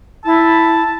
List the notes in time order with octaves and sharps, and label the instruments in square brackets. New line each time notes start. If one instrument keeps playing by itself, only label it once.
[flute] E4 [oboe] A5